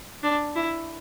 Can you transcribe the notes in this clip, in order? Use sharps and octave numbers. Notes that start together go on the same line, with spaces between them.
D4
E4